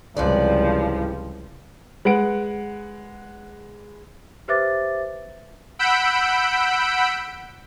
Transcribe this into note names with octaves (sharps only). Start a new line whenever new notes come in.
C#2 G#2 C3 E3 F3 G3 D5
G#3 B4 F#5 D7
G4 B4 C5 E5 D6 A6
F#5 B5 E6 G6 B6 D7